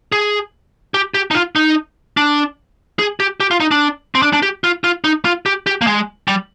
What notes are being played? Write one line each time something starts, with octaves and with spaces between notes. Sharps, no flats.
G#4
G4
G4
D#4
F4
D#4
D4
G#4
G4
G4
F4
D#4
D4
C4
D4
D4
G4
F4
F4
D#4
F4
G4
G4
A#3
G#3
G3